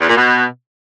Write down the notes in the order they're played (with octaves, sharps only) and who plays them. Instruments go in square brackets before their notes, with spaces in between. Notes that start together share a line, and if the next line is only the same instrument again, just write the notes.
[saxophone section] E2
A#2
B2